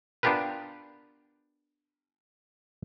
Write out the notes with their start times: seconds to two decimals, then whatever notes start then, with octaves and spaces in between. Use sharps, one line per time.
0.23 B3 D4 F4 G4 A#4 B4